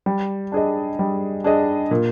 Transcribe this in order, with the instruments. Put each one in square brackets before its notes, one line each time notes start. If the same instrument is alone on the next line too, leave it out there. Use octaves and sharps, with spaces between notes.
[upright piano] G3
D4 G#4 D#5
G3
D4 G#4 D#5
A#2